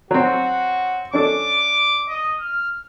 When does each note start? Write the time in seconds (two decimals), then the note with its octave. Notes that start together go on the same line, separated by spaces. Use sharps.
0.11 F#3 C4 F#4
1.13 C#4 D4 A4 D6
2.08 D#5
2.40 F6